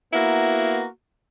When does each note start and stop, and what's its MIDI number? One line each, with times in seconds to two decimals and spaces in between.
0.13 0.85 58
0.13 0.85 59
0.13 0.85 64
0.13 0.85 66
0.13 0.85 82